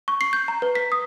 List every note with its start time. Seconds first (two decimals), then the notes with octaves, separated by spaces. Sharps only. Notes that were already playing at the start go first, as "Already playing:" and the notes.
0.08 C#6
0.21 C7
0.33 G6
0.48 A#5
0.62 B4
0.75 B6
0.92 D#6